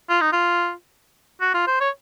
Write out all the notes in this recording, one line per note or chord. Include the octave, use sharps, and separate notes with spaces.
F4
D#4
F4
F#4
F4
C5
C#5